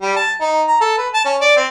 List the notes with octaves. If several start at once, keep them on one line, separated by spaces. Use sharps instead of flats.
G3
A5
D#4
A#5
A4
B4
A5
C#4
D5
C4